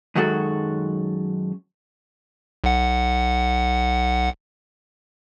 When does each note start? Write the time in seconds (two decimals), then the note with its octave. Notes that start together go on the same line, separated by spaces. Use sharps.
0.15 F#2 D#3 F#3 G#3 F#4 A4
2.64 B1 F#5